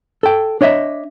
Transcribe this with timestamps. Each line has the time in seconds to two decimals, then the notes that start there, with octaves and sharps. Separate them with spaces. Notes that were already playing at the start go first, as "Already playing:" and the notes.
0.23 A4 G5
0.61 D4 C#5 D#5 E5